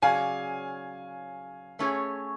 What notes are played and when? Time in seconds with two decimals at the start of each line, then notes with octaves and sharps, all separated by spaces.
0.02 C#3 F#3 C#4 G#4 D5 F5 G#5
1.79 A3 C#4 G#4 C#5